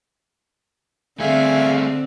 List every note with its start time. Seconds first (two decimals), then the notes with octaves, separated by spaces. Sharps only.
1.20 D3 A3 C4 G#4 E5 F5 G#5